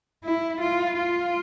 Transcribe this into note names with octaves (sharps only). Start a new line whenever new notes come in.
E4
F4
F4